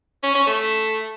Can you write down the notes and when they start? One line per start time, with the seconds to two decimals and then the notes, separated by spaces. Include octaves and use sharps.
0.23 C#4
0.35 C#4
0.47 A3